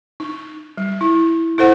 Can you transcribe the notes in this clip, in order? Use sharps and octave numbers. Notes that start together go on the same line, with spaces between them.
D#4
G3
E4
E4 A4 C5 F#5